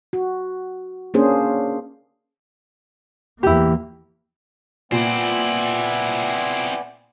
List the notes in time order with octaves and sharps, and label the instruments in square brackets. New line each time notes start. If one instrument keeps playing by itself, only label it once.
[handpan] F#4
A#3 C#4 D4 G#4 C5
[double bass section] E2 E3 A#3 [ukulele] E4 G4
[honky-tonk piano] A#2 [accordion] B3 D5 G#5 [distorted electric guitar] C4 E4